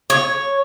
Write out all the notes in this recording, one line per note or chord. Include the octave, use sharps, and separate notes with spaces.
C#5